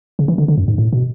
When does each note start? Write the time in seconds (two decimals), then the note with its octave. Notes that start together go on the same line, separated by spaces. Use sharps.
0.19 C#3
0.28 E3
0.38 D3
0.48 D3
0.58 F#2
0.68 G#2
0.78 A2
0.93 B2